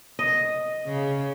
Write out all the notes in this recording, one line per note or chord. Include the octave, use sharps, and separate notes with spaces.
D#5
C#3